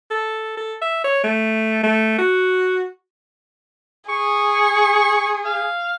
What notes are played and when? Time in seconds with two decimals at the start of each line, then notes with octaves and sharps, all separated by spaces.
0.11 A4
0.57 A4
0.82 E5
1.04 C#5
1.24 A3
1.84 A3
2.19 F#4
4.10 G#4 C#6
5.45 F5